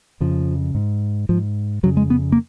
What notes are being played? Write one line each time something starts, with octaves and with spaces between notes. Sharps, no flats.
F2 C#3 F3
G#2
G#2 F3
F2 C#3 F#3
G#3
B3
A#3